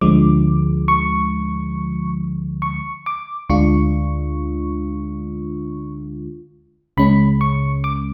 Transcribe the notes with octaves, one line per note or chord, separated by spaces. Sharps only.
D2 D3 F3 G#3 D6
C#6
C#6
D6
D2 D3 G#3 D4 F4 C#6
C#2 C#3 G#3 C#4 B5
C#6
D6